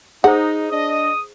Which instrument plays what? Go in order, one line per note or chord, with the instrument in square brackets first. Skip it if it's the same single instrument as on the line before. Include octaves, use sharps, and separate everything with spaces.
[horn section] D#4 [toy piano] G#4 C5 [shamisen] F#5
[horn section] D4 D#5 [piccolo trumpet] D#6